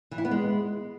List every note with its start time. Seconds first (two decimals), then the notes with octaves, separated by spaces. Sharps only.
0.11 E3
0.18 E4
0.25 B3
0.31 G#3